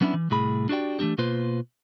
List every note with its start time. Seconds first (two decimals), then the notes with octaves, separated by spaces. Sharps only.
0.01 F#3 B3 C#4 D4 E4
0.14 E3
0.30 C2 A2 G#4 B5
0.69 D4 F#4 G4 D5 G5
0.99 E3 A3 A#3 D4 G4
1.18 B2 A#3 F4 B4 C5